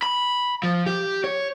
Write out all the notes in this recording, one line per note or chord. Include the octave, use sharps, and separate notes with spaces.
B5
F3
G4
C#5